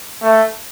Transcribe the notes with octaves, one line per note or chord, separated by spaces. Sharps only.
A3